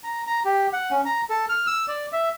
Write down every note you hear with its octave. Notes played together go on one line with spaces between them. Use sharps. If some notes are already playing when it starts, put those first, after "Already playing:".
A#5
A#5
G4
F#5
C#4
A#5
A4
F6
E6
D5
E5